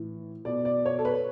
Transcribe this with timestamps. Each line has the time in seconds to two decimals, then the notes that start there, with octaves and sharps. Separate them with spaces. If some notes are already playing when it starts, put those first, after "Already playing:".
Already playing: A2 E3
0.45 B2 D5
0.65 D5
0.86 C#5
0.99 A4
1.05 B4